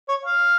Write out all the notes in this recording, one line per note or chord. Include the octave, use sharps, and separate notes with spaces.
C#5
F5